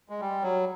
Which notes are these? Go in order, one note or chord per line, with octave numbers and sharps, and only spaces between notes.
G#3
G3
F#3